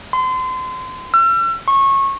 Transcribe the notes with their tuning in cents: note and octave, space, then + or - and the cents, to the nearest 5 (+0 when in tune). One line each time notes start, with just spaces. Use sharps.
C6 -35
E6 +45
C#6 -20